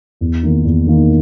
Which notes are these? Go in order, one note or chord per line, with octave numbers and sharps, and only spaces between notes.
E2
D#3 A#3 D#4
E2
D#3 A#3 D#4